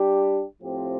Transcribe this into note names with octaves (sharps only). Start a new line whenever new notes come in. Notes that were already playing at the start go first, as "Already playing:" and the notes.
Already playing: G3 D4 G4
A2 F3 C4 G4